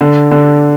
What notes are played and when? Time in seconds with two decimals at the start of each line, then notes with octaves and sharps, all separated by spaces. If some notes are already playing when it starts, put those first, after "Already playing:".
0.01 D3
0.31 D3